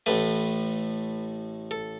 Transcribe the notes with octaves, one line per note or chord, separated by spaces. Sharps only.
A1 A2 A3 B4
A4